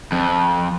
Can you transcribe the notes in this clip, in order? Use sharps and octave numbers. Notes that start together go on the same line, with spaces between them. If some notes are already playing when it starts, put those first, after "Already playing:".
F2